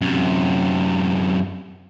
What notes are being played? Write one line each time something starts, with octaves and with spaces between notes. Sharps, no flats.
F#2 C3